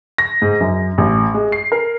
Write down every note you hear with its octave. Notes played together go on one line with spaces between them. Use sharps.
A#6
G#2
F#2
A1
G#3
C7
A#4